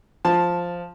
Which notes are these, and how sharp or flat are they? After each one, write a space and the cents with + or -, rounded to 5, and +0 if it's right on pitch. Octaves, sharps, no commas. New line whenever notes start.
F3 +0 A5 +0